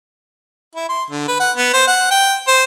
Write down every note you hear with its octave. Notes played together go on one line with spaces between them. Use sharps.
E4
C6
D3
B4
F#5
B3
C5
F#5
G5
C5